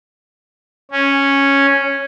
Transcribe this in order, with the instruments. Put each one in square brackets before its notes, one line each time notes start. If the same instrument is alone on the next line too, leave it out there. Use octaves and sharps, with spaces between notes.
[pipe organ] C#4